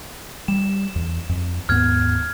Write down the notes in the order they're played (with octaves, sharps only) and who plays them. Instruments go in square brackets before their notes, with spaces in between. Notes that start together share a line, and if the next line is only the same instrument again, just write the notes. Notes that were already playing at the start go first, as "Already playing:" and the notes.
[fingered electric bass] G3 [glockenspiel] E7
[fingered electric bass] E2
F2
[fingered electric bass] D#2 G#2 B3 [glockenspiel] F6 G#6